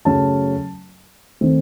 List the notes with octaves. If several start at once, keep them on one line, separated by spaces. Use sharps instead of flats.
F#2 C#3 F#3 A3 C#4 A5
D#3 A3 C4